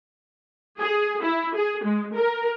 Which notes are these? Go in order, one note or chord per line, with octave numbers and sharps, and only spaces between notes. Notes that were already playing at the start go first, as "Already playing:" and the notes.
G#4
E4
G#4
G#3
A#4